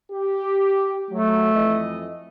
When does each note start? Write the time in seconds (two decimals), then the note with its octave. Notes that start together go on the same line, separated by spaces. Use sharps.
0.11 G4
1.11 F#3 A3
1.53 F2 E3 D#5